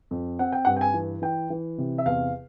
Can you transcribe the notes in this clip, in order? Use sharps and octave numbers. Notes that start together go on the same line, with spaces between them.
F2
C4 F#5
G5
G2 F#5
G5
G#5
E3
E3 G5
E3
C3
E5
E2 F5